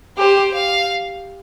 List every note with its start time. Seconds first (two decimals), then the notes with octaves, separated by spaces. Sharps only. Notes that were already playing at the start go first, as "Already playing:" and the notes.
0.17 G4 C5
0.54 F5